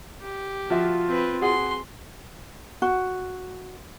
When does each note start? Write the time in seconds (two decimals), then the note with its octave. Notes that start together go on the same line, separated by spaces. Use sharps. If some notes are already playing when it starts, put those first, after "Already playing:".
0.21 G4
0.70 F3 F4 F#4 E5
1.08 C4 B4
1.42 F#4 G#4 F#5 C6
2.82 F#4